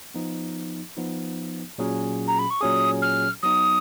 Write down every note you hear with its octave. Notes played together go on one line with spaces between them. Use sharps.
F3 B3 D#4
F3 B3 D#4
A#2 F#3 C#4 G#4
A#5
B5
C#6
A#2 F#3 C#4 G#4 D#6
F6
F#3 B3 D#4 D#6